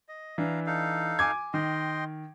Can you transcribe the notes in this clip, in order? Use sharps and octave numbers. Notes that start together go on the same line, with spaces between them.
D#5
E3 D4 F5 A#5
D#4 A4 F5
G#5 D6 G#6
D#3 D#5 G5 C6